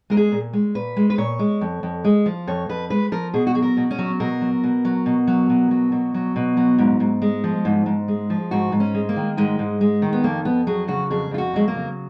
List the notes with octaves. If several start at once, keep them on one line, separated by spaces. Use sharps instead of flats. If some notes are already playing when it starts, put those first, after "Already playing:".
G#3 A#4
G#4
A#2
G#3
A#2 B4
G#3
B4
A#2 C#5
G#3
F2
F2
G#3
F3
F2 C#5
F2 B4
G#3 B4
F3 A#4
B2 G#4
F#4
F#3 G#4
A#4
B2
C#4
F#3
B2 A#4
F#3
B2
F#3
B2
F#3
B2
F#3
B2
F#3
B2
F#3
G#2
G#2
G#3
F3
G#2
G#2
G#3
F3
G#2 F#4
G#2
C#4
G#3
A#3
D#3
G#2 G#3
G#2
G#3
D#3
B3
F2 A#3
F2 B3
F#3 G#4
C#3 F#4
F2 G#4
F2 F4
F#4
F#3 G#3
A#3
C#3